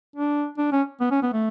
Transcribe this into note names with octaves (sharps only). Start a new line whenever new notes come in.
D4
D4
C#4
B3
C#4
B3
A3